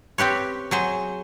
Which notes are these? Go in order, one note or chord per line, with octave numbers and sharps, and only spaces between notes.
C4 G4 B4 C#5
F#3 G#4 C5